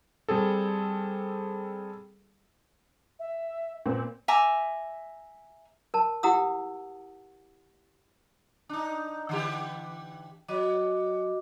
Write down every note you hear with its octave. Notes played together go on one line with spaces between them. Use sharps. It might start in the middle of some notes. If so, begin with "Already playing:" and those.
G3 C4 G#4 A4
E5
A#2 C4 B4
E5 G#5 A#5 D6
A#4 A5
E4 G4 F#5 A#5 D#6 E6
D4 D#4
D3 E3 G4
F#3 F#4 D#5 D6